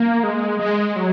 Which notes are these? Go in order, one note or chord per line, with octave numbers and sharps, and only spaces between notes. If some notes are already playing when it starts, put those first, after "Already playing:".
Already playing: A#3
G#3
G#3
F#3